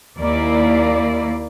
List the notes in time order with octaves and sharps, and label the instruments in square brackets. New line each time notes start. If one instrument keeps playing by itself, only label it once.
[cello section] D#2 A#3 E4 D5